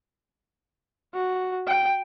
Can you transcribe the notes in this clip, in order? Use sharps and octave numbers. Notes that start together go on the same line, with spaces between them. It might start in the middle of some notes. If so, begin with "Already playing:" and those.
F#4
G5